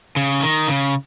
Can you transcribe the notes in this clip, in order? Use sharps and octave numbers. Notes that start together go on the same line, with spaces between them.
C#3
D#3
C#3